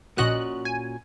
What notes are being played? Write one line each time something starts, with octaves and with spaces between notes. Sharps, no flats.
A#1 A#2 C#4 F#4 D#5 F#6
G#5